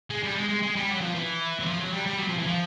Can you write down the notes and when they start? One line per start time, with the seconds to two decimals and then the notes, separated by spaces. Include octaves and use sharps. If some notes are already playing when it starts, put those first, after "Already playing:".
0.10 G#3
0.23 G3
0.36 G#3
0.49 G#3
0.63 G#3
0.76 G3
0.89 F#3
1.01 F3
1.14 E3
1.60 F#3
1.66 F3
1.80 F#3
1.92 G3
2.06 G3
2.18 F#3
2.28 F3
2.38 E3
2.47 F3